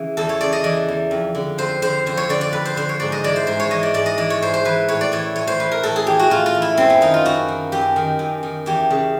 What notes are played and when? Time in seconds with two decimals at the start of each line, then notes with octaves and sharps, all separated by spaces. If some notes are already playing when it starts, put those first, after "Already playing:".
Already playing: C#3 E3
0.17 E2 A4
0.29 C#5
0.41 C#3 D5
0.53 D#5
0.64 E3 D5
0.88 E2
1.11 F2
1.35 D3
1.58 F2 C5
1.82 D3 C5
2.06 F2 C5
2.17 C#5
2.29 D3 D5
2.41 D5
2.53 F2 B4
2.65 C5
2.76 D3 C5
2.89 C#5
3.00 G#2 D5
3.12 D#5
3.24 E3 D5
3.36 C5
3.47 G#2 C5
3.60 C#5
3.70 E3 D#5
3.83 D5
3.94 G#2 D5
4.06 D#5
4.18 E3 D5
4.30 C#5
4.42 G#2 C5
4.54 C5
4.65 E3 B4
4.88 A2 C#5
5.01 D5
5.12 E3 C#5
5.36 A2 C#5
5.47 C5
5.59 E3 B4
5.72 A#4
5.83 A2 A4
5.96 G#4
6.06 E3 G4
6.19 F#4
6.30 A2 F4
6.46 F4
6.55 E3
6.62 E4
6.77 F#2 C4
6.90 B3
7.01 D#3 D#4
7.14 F4
7.25 F#2 F#4
7.48 D#3
7.72 F#2 G4
7.96 D#3
8.19 F#2
8.43 D#3
8.66 E2 G4
8.90 C#3